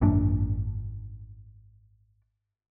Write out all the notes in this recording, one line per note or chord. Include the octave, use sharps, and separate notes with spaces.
G#1 F#2 A#2 D4